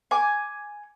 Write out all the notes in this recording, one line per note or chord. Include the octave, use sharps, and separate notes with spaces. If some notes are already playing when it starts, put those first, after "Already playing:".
G#5 D6